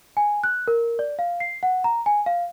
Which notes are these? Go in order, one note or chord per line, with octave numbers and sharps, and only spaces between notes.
G#5
F#6
A#4
D5
F5
C7
F#5
A#5
G#5
F5